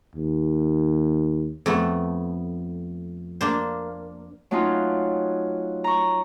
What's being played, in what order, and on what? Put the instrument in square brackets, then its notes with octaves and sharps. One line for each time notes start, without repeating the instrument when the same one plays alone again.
[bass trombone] D#2
[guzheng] F2 A3 B3
A#3 D4 C5
[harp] F#3 A3 C#4 D#4 F4
A#5 C#6